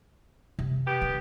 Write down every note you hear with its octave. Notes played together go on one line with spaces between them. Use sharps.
C3
B3 G4
D4